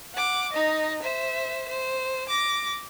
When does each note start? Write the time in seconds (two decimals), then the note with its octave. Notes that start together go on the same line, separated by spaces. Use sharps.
0.14 F#5 D6
0.53 D#4 D#5
1.02 C5 E5
1.68 C5
2.29 D6 A#6